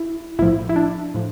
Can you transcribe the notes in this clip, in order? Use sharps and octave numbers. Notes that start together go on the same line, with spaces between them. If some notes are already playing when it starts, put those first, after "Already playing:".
Already playing: E4
B1 A2 F3 E4
E4
D4
A2 F3